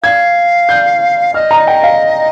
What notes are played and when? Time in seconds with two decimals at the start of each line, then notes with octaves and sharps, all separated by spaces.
0.03 F5 G#6
0.69 G6
1.34 D#5 F6
1.51 A#5
1.67 G5
1.83 F5